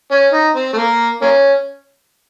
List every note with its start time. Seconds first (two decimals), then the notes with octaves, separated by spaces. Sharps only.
0.11 C#4
0.33 D#4
0.56 C4
0.73 A3
0.78 A#3
1.22 A#3 C#4